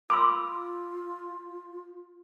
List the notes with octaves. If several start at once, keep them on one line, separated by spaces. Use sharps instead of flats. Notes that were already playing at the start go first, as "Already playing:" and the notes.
F4 B5 C6 D6 E6